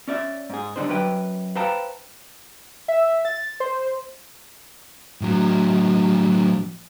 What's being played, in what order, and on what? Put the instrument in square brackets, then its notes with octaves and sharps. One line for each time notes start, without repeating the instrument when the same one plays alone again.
[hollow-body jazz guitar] C#4 D5 E5
G#2 G#4
D3 G3 D4 D#4 C5
F#2 B4 G5
B4 C5 F5 G5 A5 A#5
[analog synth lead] E5
A6
C5
[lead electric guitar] A2 F#3